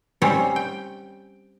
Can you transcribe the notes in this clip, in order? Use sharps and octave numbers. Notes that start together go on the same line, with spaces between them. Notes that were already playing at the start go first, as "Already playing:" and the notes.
G3 C4 C#4 C5 C#5
G5